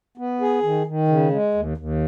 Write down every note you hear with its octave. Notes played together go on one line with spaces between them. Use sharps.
B3
G#4
D#3
D#3
C#3
G#3
D#2
D#2